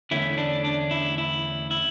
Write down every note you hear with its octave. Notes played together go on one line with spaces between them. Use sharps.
E2 D3 A3 C#4 E4
D4
D4
E4
E4
E4